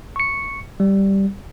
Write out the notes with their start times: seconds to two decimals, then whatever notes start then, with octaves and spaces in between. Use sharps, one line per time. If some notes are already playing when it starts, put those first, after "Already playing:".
0.16 C#6 C#7
0.80 G3